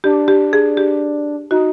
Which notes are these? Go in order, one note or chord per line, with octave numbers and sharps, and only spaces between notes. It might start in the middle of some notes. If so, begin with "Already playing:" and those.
D4 G4
G4
G#4
G4
D#4 F#4